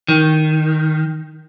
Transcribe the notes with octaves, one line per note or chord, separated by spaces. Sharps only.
D#3